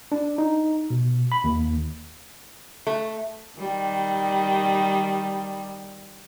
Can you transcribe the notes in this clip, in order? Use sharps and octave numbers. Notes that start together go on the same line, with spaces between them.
D4
D#4
B2
B5
D#2
A3
D#3 G3